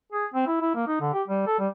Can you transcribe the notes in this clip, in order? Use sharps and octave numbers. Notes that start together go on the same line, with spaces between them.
G#4
C4
E4
E4
A#3
D#4
D3
G4
G3
A4
G3